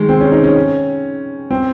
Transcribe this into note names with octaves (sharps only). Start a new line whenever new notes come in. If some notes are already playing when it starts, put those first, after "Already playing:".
Already playing: D#3 G#3
C4
C#4
D#4
C#4
C4